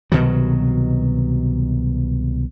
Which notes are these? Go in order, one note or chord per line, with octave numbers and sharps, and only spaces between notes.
C2 B2 D#3 F#3